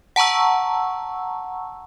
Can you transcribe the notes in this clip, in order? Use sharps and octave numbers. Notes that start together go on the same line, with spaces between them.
F#5 A5 A#5 C#6 E6